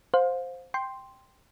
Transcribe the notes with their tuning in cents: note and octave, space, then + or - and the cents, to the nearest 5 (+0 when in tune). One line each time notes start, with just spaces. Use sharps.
C5 +0 F5 +30
G5 +0 C6 +0